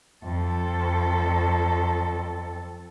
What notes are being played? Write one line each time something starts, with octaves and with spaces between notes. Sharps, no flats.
F2 A4